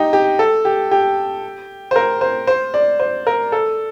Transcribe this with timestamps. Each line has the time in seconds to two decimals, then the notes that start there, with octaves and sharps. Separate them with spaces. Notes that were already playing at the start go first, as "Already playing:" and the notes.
Already playing: D#4 G4
0.13 G4
0.39 A4
0.65 G4
0.91 G4
1.91 C5
1.96 A#4
2.21 C5
2.47 C5
2.74 D5
3.00 C5
3.27 A#4
3.52 A4